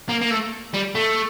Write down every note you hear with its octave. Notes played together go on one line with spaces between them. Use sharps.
A#3
A#3
A3
G3
A3